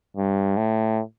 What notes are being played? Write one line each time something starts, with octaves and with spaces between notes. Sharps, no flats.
G2
A2